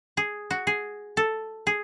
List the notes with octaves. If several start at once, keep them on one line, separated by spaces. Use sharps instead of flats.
G#4
F#4
G#4
A4
G#4